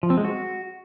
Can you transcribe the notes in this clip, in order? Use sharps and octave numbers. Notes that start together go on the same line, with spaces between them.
F3
C4
G#3
F#4